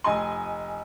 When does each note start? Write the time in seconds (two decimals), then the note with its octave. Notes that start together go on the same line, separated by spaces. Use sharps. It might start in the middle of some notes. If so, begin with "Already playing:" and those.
0.04 F1 D#5 G#5 C6